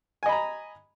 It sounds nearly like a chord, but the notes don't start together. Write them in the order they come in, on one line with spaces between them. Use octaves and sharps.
G#5 D#5 B5 A#5